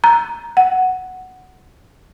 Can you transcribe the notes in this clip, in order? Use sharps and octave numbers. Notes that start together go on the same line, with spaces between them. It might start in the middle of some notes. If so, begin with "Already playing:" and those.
A#5
F#5